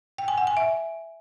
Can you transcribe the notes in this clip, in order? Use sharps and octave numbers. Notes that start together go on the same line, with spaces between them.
G5
G#5
F#5
G#5
E5